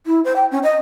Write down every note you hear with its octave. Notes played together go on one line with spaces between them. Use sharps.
E4
C5
G5
C#4
D#5